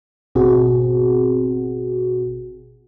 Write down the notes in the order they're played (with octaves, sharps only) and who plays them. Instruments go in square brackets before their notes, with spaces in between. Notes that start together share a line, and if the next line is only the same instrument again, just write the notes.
[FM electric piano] G#1 B2 C4 F#4 G#4